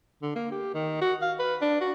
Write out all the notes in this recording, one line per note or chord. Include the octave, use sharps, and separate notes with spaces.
D3
A#3
G4
D#3
F#4
F5
B4
D4
F#4